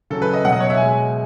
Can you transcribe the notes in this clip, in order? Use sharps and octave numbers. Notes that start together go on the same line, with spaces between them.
C#3 F#3 A4
B4
D#5
B2 F#3 F#5
D#5
C#5
E5
B2 G#3 G#5